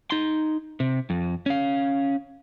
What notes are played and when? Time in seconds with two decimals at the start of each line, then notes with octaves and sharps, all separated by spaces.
0.10 D#4 C6
0.80 C3
1.10 F2
1.46 C#4 F5